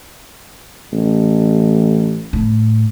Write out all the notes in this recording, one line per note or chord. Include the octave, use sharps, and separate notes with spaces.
A1
A2